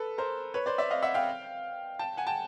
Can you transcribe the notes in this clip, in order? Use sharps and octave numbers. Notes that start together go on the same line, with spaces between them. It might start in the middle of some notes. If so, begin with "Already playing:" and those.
Already playing: A4 B4
A#4 C5
B4 C#5
C5 D5
D5 E5
D#5 F5
E5 F#5
F5 G5
G5 A5
F#5 G#5
G5 A5